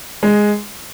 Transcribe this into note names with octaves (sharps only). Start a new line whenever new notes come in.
G#3